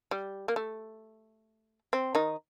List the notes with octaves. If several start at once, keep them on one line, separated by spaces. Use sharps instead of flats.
G3
A#3
A3
C4
D#3 D#4